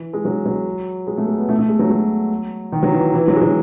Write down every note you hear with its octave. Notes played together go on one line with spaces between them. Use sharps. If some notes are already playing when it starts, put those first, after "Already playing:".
Already playing: E3
G#3
F#3
F#3
G#3
A3
G#3
B3
A3
A3
G#3
F#3
F#3
D#3
F#3
E3
E3
F#3
G#3
F#3